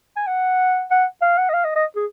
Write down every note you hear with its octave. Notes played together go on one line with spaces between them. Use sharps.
G#5
F#5
F#5
F5
F#5
D#5
F5
D#5
D#5
G#4